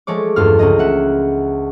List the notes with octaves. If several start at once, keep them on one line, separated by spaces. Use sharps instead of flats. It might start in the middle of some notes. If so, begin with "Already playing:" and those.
F3 G#3 A3 C#5 D6
E2 G2 F4 A4 F6
C#2 A#3 D#5
E5 F#5